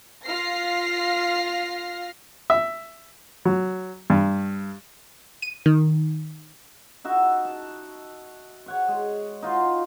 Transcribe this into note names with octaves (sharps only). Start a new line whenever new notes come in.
F4 F5 F6 A#6 C7
E5
F#3
G2
D#7
D#3
D#4 F#4 E5
A5
C#5 F#5 C#6
G#3
D#4 F4 F#4 C6